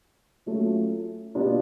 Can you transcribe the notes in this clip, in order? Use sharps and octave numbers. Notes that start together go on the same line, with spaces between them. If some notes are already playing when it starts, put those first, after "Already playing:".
F#3 A3 C#4 F4 A4
B2 G3 B3 D4 F4